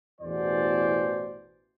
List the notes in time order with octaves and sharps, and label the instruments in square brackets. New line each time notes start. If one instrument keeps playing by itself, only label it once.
[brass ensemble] A1 E2 B2 E3 C5 D5